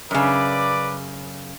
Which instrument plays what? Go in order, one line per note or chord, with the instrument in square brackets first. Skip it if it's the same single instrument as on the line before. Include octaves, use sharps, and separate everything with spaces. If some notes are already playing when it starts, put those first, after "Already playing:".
[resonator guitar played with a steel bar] F#2 C#3 [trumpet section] B4 D5 D6